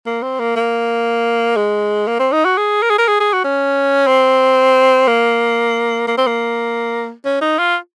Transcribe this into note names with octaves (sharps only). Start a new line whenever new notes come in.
A#3
C4
A#3
A#3
G#3
A#3
C4
D#4
F#4
G#4
A#4
G#4
A#4
G#4
G#4
F#4
C#4
C4
A#3
A#3
C4
A#3
C#4
D#4
F4